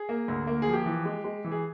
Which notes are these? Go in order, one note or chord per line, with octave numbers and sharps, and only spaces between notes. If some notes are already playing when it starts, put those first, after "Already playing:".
Already playing: G#4
A#3
D2
A#3
F3 G#4
G4
E3
G#3
G#3
E3
G#4